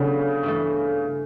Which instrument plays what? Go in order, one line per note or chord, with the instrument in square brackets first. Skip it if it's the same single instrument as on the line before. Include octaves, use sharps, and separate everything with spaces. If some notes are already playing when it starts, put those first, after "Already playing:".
Already playing: [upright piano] C#3 [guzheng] F#3 B3 D4 A4
[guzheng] G2 E3 A3